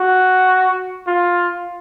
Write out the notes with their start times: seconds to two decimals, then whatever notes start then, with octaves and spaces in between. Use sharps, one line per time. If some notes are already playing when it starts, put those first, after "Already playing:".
Already playing: F#4
1.07 F4